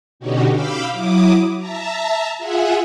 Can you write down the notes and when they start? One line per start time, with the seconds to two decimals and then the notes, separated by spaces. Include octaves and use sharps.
0.20 B2 D3 C#4 D#4 F#4 G4
0.51 F5 B5 D6 E6 F6 G6
0.92 F#3 E4 D6 D#6
1.57 E5 A5 A#5
2.38 F4 G#4 E5 F#5 G#5